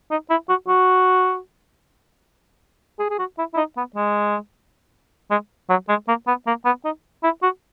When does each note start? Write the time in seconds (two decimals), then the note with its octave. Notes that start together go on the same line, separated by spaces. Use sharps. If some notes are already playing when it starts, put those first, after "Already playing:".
0.11 D#4
0.30 E4
0.49 F#4
0.68 F#4
2.99 G#4
3.10 G#4
3.19 F#4
3.38 E4
3.54 E4
3.57 D#4
3.77 B3
3.96 G#3
5.31 G#3
5.70 F#3
5.89 G#3
6.08 A#3
6.27 B3
6.47 A#3
6.65 B3
6.84 D#4
7.23 E4
7.43 F#4